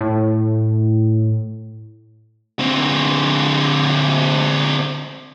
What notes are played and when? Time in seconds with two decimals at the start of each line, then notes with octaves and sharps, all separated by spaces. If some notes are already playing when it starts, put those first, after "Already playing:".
0.01 A2
2.59 D3 C4